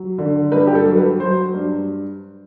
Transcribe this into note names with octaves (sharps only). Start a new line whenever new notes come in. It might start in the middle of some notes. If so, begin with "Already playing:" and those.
Already playing: F#3
D3
G2 B4
G4
A4
F#3
B4
F#3 C5
G2